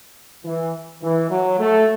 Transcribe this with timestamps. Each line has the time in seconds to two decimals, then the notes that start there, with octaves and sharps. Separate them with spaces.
0.44 E3
1.02 E3
1.30 F#3
1.58 A3